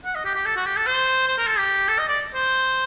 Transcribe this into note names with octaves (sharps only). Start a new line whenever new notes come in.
F#5
D#5
G4
G4
A4
F#4
G4
A4
C5
C5
A#4
A4
G4
A4
D#5
D5
C5